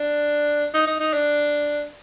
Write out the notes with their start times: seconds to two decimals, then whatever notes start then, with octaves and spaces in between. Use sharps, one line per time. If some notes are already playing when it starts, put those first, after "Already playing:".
Already playing: D4
0.74 D#4
0.87 D#4
1.00 D#4
1.13 D4